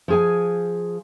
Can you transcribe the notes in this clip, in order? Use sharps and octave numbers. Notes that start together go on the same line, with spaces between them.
F3 G#4 G#5